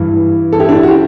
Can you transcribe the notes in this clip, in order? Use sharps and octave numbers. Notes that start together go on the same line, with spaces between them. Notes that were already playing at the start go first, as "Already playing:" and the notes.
Already playing: G2 E3
A4
E4 G4
D4
E4
F#4
G4